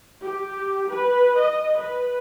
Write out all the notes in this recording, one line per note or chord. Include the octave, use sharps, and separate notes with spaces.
G4
B4
D#5
B4